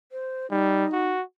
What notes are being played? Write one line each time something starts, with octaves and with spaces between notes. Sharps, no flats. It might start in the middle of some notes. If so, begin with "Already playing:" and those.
C5
G3 D#4
F#4